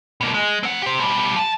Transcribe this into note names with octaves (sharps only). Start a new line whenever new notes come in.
B2 A#3
G#3
C4 F#5
G4 C5
B2 G3
F3 A5